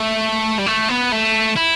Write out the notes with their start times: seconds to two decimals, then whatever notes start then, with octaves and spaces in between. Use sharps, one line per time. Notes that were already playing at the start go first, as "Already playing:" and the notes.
Already playing: A3
0.59 G3
0.66 A3
0.89 B3
1.12 A3
1.56 E4